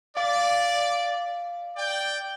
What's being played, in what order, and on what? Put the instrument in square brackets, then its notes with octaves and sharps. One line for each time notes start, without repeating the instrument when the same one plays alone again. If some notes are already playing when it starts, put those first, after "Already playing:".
[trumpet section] D5 [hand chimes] F5
[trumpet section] D5 G5